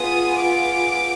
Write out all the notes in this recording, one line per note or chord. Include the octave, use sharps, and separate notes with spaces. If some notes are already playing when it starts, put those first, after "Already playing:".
Already playing: B3 F4 G#4 D#6
D6